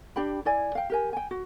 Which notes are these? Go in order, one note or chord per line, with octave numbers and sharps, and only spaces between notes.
D4 G4 G5 B5
E4 D5 G#5
F5 G5
G4 A#4 G#5
G5 G#5
F#4